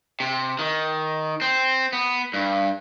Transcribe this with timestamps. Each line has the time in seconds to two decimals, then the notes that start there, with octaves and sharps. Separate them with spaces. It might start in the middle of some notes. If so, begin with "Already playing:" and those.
0.20 C3
0.59 D#3
1.41 C4
1.93 B3
2.34 G2